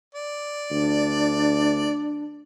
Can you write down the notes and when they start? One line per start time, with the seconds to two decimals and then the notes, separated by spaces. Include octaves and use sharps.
0.15 D5
0.71 D2 D4